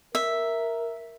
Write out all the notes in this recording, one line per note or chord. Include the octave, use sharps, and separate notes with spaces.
A#4 E5